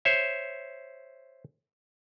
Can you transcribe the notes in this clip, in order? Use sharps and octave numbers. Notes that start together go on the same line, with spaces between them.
C5 C#5 E5